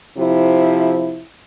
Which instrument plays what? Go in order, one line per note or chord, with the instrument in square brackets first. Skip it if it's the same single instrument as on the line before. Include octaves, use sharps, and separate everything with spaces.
[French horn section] C3 F3 E4